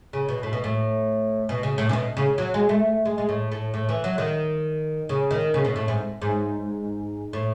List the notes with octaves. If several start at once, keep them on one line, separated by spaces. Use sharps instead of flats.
C#3
B2
A2
B2
A2
B2
C#3
A2
C#3
B2
C#3
F#3
G#3
A3
G#3
G#3
A2
A2
A2
E3
F#3
D#3
C#3
D#3
C#3
B2
A2
G#2
G#2
A2